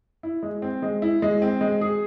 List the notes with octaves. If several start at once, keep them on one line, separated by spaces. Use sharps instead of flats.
E4
G#3
C4
G#3
E4
G#3
C4
G#3
G#4